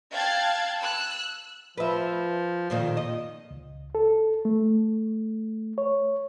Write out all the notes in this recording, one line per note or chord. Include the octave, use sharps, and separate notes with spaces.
F5 G5 A5 F#6 G#6 A6
E6 F#6
F3 B4 E5
F2 A#2 D#3
D#5
C#2
A4
A3
C#5